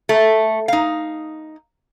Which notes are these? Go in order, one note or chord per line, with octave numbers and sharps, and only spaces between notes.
A3
D#4 F5